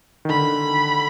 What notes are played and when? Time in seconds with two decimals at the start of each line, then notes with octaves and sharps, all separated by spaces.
0.25 D#3
0.29 D3 B5